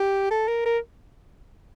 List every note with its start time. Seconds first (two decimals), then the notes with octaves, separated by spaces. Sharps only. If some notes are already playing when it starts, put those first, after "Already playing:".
Already playing: G4
0.30 A4
0.48 A#4
0.65 A#4